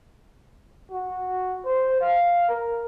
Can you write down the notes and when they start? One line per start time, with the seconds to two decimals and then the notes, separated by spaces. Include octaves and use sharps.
0.91 F#4
1.65 C5
2.01 F5
2.49 A#4